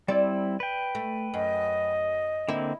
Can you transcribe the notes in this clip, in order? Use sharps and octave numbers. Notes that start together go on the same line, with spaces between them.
G3 C4 E4 D5
B4 G5
A3
F#2 D#5
D3 A#3 C4 E4